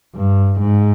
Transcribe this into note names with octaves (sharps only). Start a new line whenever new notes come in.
G2
G#2